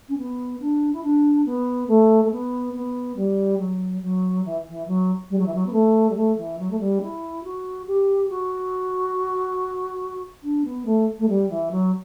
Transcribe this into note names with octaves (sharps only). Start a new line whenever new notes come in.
C#4
B3
D4
E4
D4
B3
A3
A3
B3
B3
G3
F#3
F#3
E3
E3
F#3
G3
F#3
E3
F#3
B3
A3
G3
A3
E3
F#3
A3
G3
E4
F#4
G4
F#4
D4
B3
A3
A3
G3
E3
F#3